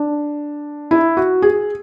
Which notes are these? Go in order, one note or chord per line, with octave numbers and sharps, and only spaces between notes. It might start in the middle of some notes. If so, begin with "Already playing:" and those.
Already playing: D4
E4
F#4
G#4